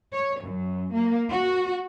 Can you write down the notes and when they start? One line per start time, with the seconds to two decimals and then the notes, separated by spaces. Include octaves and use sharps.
0.12 C#5
0.41 F#2
0.93 A#3
1.29 F#4